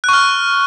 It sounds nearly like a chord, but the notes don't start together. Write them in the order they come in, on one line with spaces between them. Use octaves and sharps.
F#6 C#6 F6